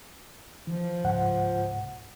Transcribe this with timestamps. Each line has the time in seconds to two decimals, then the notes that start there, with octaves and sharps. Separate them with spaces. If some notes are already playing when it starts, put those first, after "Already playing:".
0.67 E3 F3
1.04 C#2 G#2 F#5